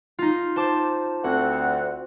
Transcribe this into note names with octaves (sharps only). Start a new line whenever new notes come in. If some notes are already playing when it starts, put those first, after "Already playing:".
D#4 F4
C5 A5 D6
D2 C4 F#4 F#5